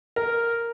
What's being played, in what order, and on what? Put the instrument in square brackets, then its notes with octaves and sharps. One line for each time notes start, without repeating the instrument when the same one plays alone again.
[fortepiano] A#4